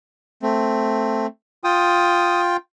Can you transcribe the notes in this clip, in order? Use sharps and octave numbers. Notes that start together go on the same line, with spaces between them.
A3 C4
F4 G5 D#6